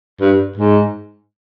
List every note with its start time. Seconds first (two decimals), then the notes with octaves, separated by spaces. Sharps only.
0.20 G2
0.57 G#2